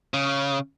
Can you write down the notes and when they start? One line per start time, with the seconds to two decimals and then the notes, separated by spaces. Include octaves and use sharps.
0.14 C#3